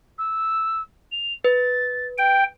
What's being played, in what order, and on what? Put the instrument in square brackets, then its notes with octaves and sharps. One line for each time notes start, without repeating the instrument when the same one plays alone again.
[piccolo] E6
F7
[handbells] B4 [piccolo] A6
[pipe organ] G5 [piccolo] D7